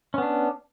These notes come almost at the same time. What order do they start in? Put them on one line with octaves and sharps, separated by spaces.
C#4 B3 D4